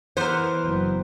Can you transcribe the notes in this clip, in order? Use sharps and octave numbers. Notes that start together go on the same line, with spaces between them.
E3 B3 A#4 C5
F#1